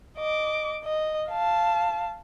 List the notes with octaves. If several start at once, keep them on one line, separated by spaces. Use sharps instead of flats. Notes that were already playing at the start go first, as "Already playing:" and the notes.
D#5 D6
D#5
F5 A5